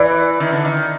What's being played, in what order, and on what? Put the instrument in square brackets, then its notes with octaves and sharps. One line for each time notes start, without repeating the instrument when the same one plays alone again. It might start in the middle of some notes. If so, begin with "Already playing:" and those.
Already playing: [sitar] E3 [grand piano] D5
[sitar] D#3
D3
D#3